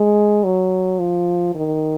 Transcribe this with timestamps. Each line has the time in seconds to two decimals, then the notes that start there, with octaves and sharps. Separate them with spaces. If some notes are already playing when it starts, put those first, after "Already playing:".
Already playing: G#3
0.44 F#3
0.99 F3
1.55 D#3